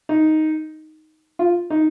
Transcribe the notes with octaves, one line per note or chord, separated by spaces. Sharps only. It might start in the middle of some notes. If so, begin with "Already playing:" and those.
D#4
F4
D#4